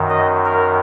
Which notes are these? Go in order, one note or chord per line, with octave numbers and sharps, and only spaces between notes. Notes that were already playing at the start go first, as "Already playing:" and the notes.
Already playing: F#2 D#3
D#5
A#4